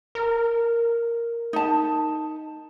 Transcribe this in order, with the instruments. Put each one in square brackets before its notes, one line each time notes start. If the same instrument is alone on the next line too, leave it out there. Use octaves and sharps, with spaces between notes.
[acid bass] A#4
[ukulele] D#4 A5